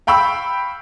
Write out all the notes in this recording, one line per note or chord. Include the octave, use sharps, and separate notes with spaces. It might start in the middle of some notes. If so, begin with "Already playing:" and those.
F5 G5 B5 C#6 E6